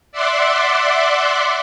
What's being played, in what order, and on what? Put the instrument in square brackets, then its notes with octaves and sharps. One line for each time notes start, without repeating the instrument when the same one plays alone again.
[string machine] D5 E5 F#5 C6 D6